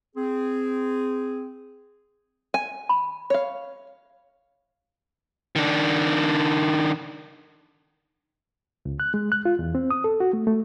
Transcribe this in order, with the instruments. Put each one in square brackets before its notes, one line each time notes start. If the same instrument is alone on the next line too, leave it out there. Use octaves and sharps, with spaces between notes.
[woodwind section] C4 G#4
[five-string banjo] G#5
[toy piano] B5
[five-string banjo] C#5 F5
[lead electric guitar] D#3 D4
[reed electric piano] C#2
F#6
G#3
F#6
F4
E2
C4
D#6
A4
F#4
A3
A3